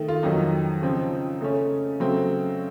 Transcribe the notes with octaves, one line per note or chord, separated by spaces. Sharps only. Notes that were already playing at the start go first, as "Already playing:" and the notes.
Already playing: D#3 A3
F4
F2 D#3 F#3 D#4
C#3 F3 C4
C#3 A3 C#4
C#3 F#3 A3 C4